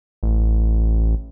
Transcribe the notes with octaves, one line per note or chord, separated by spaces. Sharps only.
A1